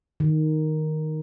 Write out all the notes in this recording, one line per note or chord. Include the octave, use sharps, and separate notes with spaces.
D#3